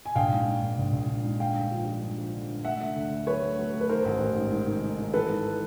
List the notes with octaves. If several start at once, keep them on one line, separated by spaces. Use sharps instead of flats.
G#5
A#1 F5 G5
G#2
G#2
A#1
A#1
A#1
A#1
G#2
D3 F5 G5
G2
F3
F3
G2
F3
D3
G2
A3 E5 F#5
D3
D2
D3
F#3 B4 C#5
A3
F#3
A3
B4
D#3 A#4 C5
A1
A1
G#2
G#2
D#3
D#3
D#3
E3 A4 B4
G#2